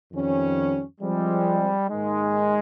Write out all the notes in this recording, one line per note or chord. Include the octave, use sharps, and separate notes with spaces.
F2 D#3 G3 C#4
F3 G3 G#3 C4
G#2 D#3 G#3 A#3 D#4